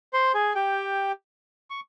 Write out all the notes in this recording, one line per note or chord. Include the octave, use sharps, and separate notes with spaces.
C5 C6
G#4 G#5
G4 G5
C#6